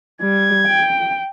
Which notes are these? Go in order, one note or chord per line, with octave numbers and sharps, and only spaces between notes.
G3 G#6
G5